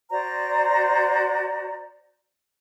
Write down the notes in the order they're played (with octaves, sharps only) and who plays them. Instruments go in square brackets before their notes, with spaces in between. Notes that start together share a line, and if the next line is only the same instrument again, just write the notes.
[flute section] F#4 C5 D5 A#5